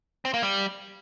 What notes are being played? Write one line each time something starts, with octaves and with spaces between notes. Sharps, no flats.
C4
A#3
G3